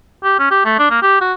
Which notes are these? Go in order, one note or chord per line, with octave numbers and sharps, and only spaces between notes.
G4
C#4
G4
A3
D4
A#3
G4
F#4